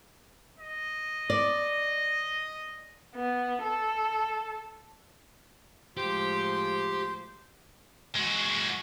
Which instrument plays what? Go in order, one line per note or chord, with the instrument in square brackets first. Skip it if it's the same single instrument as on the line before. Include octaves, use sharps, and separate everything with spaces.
[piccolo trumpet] D#5
[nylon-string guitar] D5
[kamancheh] B3
A4
[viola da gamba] A2 F3 G#3 [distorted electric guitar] G4 [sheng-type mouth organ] C5
[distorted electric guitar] G#3 F#4